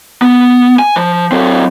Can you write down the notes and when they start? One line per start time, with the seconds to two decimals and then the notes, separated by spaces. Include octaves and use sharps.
0.22 B3
0.79 G#5
0.96 F3
1.32 F#3 C4